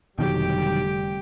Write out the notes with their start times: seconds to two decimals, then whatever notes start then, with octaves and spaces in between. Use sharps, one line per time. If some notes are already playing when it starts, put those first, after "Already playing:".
0.19 F1 B2 D3 D#3 F#3 G3 G4 G5